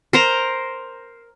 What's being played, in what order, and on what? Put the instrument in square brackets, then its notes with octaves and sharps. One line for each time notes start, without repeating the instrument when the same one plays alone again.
[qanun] A#4 C5 A#5